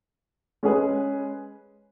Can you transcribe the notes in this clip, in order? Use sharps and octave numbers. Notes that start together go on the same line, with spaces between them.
G#3 C#4 G#4 B4